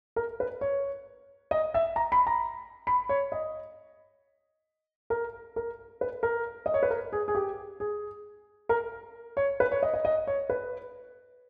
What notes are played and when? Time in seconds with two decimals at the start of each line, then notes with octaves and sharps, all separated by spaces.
0.16 A#4
0.40 B4
0.61 C#5
1.51 D#5
1.74 E5
1.96 A#5
2.12 B5
2.27 A#5
2.87 B5
3.09 C#5
3.32 D#5
5.10 A#4
5.56 A#4
6.01 B4
6.23 A#4
6.66 D#5
6.74 C#5
6.83 B4
6.90 A#4
7.13 G#4
7.28 G#4
7.35 G4
7.80 G#4
8.69 A#4
9.37 C#5
9.60 B4
9.72 C#5
9.83 D#5
9.94 D#5
10.05 D#5
10.27 C#5
10.50 B4